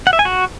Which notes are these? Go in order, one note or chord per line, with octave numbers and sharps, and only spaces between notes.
F#5
E5
G#5
F#4